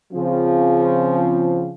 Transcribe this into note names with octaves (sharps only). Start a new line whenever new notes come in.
C#3 F3 C4